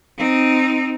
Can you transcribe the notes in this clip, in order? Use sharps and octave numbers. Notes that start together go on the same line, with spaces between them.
C4 D#4